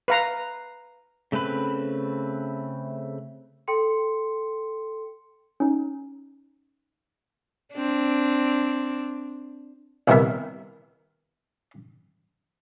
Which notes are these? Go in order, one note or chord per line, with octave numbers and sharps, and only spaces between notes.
B4 F5 A#5
C#3 A3 C4 B4 B5
A4 G5 C6 C#7
C#4 D#4
C4 D4
C2 C3 D#3 B3 A#4 E5